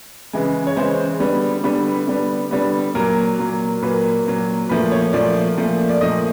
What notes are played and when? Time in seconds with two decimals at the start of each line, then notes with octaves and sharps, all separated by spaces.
0.33 C#3 E3 G#3
0.67 C#5
0.76 C#3 E3 G#3 C5
1.20 D3 G3 B3
1.64 D3 G3 B3 B4
2.07 D3 G3 B3
2.51 D3 G3 B3
2.95 A#2 F#3 A#3 A#4
3.38 A#2 F#3 A#3
3.82 A#2 F#3 A#3 B4
4.26 A#2 F#3 A#3
4.69 A#2 F3 A3 B4
4.92 C#5
5.13 A#2 F3 A3 D5
5.57 A#2 F3 A3
5.89 D5
6.01 A#2 F3 A3 D#5